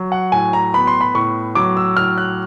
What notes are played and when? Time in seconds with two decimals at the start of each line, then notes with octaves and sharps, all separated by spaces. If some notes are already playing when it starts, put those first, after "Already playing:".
Already playing: F#3
0.12 F#5
0.32 A2 G#5
0.53 A#5
0.74 B3 B5
0.87 C6
1.01 B5
1.15 A2 C#6
1.55 F#3 D6
1.77 E6
1.97 A2 F6
2.18 F#6